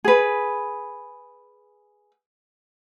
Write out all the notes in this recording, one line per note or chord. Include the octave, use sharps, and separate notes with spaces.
G#4 B4